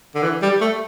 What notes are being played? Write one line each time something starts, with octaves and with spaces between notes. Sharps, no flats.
D3
E3
G3
A3